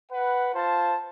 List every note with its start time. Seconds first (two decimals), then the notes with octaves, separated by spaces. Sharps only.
0.12 B4 F#5
0.55 F4 C5 A5